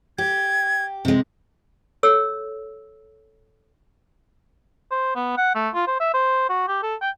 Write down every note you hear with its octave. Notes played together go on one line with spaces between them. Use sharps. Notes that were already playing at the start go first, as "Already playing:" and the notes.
G4 G#6
C3 G#3
A4 C#5 E6
C5
B3
F#5
A3
F4
C5
E5
C5
F#4
G4
A4
G5